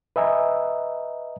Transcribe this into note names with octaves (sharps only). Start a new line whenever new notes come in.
B4 D#5 E5 G#5 A#5